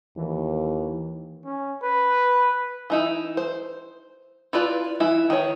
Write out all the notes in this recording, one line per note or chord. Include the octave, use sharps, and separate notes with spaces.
D#2 E3
C#4
B4
E3 D#4 E4
C5
E4 F4 B4 D5
E3 E4
D#3 C#5